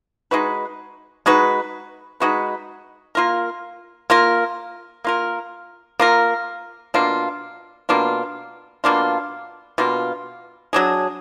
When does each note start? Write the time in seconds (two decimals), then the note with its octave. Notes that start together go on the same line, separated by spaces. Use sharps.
0.31 G#3 D#4 F#4 B4
1.26 G#3 D#4 F#4 B4
2.20 G#3 D#4 F#4 B4
3.15 A#3 F4 A#4
4.10 A#3 F4 A#4
5.04 A#3 F4 A#4
5.99 A#3 F4 A#4
6.94 B2 A#3 D4 F4
7.89 B2 A#3 D4 F4
8.84 B2 A#3 D4 F4
9.78 B2 A#3 D4 F4
10.73 F#3 D4 G#4